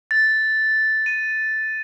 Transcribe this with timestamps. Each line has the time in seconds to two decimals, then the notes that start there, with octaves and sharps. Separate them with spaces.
0.11 A6
1.06 D#7